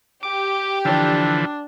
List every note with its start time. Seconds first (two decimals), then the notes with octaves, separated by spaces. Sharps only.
0.23 G4 D6
0.85 D3 E3 F3 D4